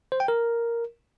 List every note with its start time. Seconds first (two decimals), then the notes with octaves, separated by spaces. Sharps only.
0.12 C5
0.20 G5
0.28 A#4